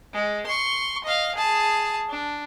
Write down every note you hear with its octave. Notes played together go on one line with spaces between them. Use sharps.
G#3
C6 C#6
D#5 F5
G#4 A5
D4